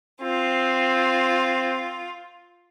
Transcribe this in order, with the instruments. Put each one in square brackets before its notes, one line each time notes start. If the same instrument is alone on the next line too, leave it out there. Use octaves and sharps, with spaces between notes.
[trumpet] C4 [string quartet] F4